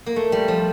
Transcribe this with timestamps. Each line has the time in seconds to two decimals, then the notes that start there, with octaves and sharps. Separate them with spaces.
0.06 A#3
0.16 A3
0.32 G3
0.48 F3